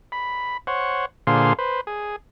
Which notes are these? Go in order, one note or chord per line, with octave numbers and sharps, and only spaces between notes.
B5
C5 C#5 F#5
A#2 D3 G#4 C5 F5 C6
B4 C5
G#4